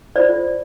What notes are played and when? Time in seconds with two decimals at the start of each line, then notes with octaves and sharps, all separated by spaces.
0.16 F4 A4 C5 D5